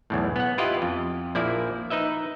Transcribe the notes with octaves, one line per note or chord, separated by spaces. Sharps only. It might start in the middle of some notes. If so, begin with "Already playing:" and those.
B1 E2 A2
B3 F#5
E4 F4 G4 B4 D#5
F2
A#1 F3 A#3 E4 D5
D#4 B4 D#5 E5